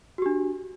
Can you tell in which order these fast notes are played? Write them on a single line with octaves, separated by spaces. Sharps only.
F#4 G4 D4